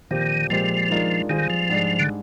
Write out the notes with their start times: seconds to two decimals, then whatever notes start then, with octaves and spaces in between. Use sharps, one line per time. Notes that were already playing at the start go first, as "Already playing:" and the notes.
0.11 A#2 D#3 F3 C4 G4
0.50 A#2 F3 G#3 C4 G4
0.90 D#3 G#3 D4 F4 A#4
1.30 D#3 G3 C4 F4 G#4
1.50 F3
1.70 G#2 G3 D4 G#4
1.99 D3